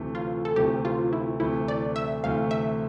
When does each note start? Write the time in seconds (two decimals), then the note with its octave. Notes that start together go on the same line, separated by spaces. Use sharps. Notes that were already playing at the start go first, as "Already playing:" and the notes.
Already playing: D2 C3 E3 A3
0.15 F4
0.45 A4
0.56 D2 C3 E3 A3 G4
0.85 F4
1.13 E4
1.40 D2 C3 E3 A3 E4
1.68 D5
1.96 E5
2.23 D2 C3 E3 A3 F5
2.51 E5